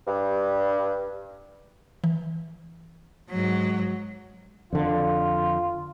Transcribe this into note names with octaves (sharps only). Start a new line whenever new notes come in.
G2
E3
G#2 F#3
F2 D3 F4